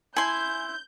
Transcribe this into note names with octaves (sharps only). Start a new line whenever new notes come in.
E4 G#5 C6 G6